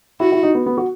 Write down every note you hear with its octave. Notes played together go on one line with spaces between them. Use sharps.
E4 F#4
E4
D#4
B3
B3
F#4